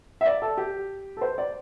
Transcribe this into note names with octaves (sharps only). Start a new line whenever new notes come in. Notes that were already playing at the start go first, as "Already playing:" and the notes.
E5
D5
A4
G4
A4
C5
D5